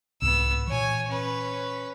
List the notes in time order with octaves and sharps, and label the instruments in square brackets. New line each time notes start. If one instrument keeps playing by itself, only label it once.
[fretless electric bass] C2 G#2 [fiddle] B3 E6
[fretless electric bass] A#2 E3 [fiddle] C#5 G#5
[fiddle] C#4 B4